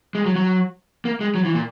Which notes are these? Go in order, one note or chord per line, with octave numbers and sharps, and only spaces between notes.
G#3
F#3
F#3
A#3
G#3
F#3
E3
A#2